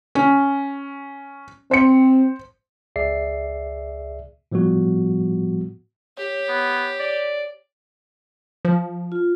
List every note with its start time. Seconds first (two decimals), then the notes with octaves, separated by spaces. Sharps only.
0.15 C#4
1.71 C4 C5 C#7
2.96 C#2 G#4 D5 E5 C7
4.52 A2 F3 G3 B3 F#4
6.17 G4 C#5
6.49 B3
7.00 D5
8.65 F3
9.12 F4